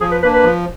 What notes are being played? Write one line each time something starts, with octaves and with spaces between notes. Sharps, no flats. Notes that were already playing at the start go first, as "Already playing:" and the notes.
F3 G#4
B4
A#3 D4 B4
B4
F3